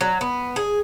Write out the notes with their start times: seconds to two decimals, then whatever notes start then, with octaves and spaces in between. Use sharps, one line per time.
0.01 F#3
0.21 B3
0.56 G#4